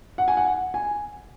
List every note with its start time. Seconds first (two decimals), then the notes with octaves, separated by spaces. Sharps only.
0.18 F#5
0.28 G#5
0.37 F#5
0.74 G#5